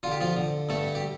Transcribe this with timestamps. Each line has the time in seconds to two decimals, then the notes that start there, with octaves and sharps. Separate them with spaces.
0.03 D3 F4
0.12 G4
0.21 F3 F4
0.37 D3
0.69 G2 A3 A4
0.95 G4